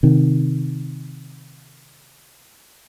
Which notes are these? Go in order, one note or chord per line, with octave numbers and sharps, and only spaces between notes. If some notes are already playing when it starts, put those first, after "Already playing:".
C3 D#3